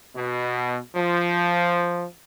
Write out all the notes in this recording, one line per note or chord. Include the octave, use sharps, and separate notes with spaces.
B2
F3